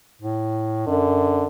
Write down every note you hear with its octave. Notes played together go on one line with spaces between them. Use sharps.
A2
F#2 D3